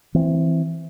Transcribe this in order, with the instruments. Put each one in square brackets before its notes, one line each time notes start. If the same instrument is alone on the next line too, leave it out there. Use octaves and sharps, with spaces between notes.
[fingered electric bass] E3 C4